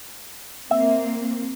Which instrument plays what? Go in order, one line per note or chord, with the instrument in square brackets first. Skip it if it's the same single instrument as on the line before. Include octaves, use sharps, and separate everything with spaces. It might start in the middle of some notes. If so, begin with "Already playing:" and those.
[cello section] A#3 C4 [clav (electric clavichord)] E5